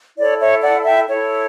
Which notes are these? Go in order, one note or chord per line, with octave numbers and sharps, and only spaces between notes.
E4 A4 C#5 D5
C#5 E5
D5 F#5
E5 G5
E4 A4 C#5